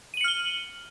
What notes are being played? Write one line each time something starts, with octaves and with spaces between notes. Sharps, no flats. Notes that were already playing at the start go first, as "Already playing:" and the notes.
F6 C#7 D#7 F#7 G7